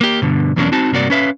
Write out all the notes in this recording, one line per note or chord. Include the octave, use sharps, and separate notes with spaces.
A#3 G4
G2 B2 D3
E2 B2 F#3 A#3 C#4 D4
C4 D#4 F#4 A5
G2 C3 A#3 F#4 D5
C#4 B4 E5 F5